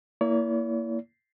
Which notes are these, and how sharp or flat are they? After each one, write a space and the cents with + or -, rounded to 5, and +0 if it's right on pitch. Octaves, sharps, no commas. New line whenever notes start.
A#3 +0 E4 +0 C#5 +45